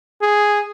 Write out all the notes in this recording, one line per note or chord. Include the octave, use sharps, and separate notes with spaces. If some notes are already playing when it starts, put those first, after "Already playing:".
G#4